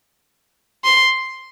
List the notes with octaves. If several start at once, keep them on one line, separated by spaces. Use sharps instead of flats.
C6